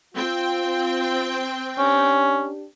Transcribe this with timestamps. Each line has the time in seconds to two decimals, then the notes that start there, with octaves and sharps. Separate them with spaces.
0.15 C4 F4 G5
1.78 C#4 D4 G4